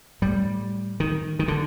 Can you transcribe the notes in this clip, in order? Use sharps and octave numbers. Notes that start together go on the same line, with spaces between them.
A2 G3
D#3
D#3
D3